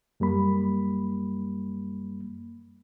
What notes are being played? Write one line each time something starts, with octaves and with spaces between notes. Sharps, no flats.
F#2 G3 A#3 B5